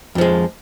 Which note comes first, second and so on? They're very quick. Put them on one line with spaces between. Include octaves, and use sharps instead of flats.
F2 F3 G#3